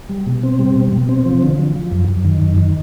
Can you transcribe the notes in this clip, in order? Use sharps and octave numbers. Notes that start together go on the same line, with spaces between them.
G3
B2
C4
G3
B2
B2
C4
F3
D3
F3
F3
F#2
F#2
D#3
F#2
D#3